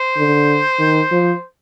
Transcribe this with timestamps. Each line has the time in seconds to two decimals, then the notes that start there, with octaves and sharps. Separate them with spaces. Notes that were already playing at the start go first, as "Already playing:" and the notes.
Already playing: C5
0.17 D3
0.79 D#3
1.11 F3